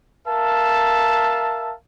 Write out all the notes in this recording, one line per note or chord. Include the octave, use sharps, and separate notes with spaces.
A#4 E5 F5 A5